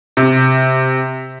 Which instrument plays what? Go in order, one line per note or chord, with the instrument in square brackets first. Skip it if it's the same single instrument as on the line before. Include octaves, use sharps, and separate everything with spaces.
[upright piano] C3